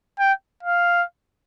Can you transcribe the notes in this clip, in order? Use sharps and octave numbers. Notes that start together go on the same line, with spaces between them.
G5
F5